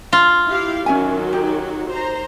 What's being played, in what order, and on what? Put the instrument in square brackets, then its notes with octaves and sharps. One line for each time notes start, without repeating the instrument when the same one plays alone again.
[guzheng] F4
[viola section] E4 G4 F5
[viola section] D#3 F#3 F#4 [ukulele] C#4 E5 G#5
[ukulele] D#4 G4
[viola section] C5 A#5